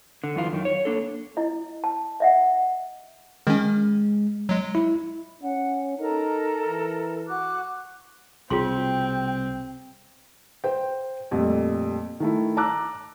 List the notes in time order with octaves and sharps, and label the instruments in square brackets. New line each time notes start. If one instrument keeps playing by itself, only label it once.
[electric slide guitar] D3
F#2 E3 F4
F#2 D#3
C#5
A#3 D4 A4
[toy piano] E4 D#5
A5
D#5 E5 F#5
[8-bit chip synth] D#3 C#4 [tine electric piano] G#3
[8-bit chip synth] F#3 G#3
[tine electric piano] E4
[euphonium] C#4 [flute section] F#5
[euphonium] D#4 [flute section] A4 A#4 A#5
[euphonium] E3
[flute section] F#4 D6 F#6
[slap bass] C2 B2 [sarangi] C4 [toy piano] F4 G#4 C6 [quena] G5
[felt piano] C5 G5
F2 A#2 G3 A3
D#3 A3 E4
A5 A#5 D6 E6 F#6